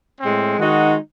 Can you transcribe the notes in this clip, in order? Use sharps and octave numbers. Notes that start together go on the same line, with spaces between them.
A2 G#3 C4
D#3 G#3 D#4 F#4